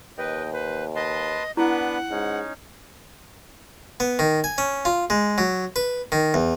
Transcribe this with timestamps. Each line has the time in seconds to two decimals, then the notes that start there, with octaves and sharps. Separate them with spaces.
0.18 D#2 B4 D#5 G5
0.53 B4 C5
0.95 B4 D#5 A5 C6
1.57 B3 D4 E4 B4 F#5
2.11 G#2 C#4 D#4
4.00 B3
4.19 D#3
4.44 G#5
4.58 C#4
4.85 F4
5.10 G#3
5.38 F#3
5.76 B4
6.12 D#3
6.34 E2